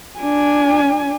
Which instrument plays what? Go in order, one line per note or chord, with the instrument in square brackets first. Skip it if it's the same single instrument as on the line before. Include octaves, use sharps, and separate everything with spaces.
[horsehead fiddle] D4 G#5